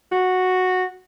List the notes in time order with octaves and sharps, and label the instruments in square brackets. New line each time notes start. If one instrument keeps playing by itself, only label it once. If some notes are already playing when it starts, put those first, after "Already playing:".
[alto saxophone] F#4